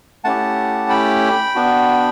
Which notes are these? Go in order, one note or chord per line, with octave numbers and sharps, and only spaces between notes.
A3 C#4 E4 G4 F#5 A5
G5 B5
B3 D4 F#4